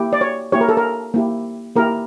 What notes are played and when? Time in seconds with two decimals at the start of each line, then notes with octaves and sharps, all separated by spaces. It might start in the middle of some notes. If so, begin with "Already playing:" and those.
Already playing: A#3 E4 G4
0.13 D5
0.21 C#5
0.52 A#3 E4 G4 C#5
0.61 A#4
0.69 A4
0.77 A#4
1.14 A#3 E4 G4
1.76 A#3 E4 G4 A#4